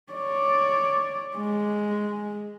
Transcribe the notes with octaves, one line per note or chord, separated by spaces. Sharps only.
C#5 D5
G#3